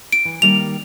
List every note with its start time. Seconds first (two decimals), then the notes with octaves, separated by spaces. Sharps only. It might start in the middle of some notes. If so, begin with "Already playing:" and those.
0.12 D7
0.25 E3
0.42 D#3 G3 A#3 F7